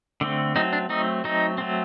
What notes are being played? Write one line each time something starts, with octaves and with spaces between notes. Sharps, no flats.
D3 A3 C4
F#3 A3 C4 D#4
D4
F#3 A3 C4 D#4
F#3 A3 C4 D#4
F#3 A3 C4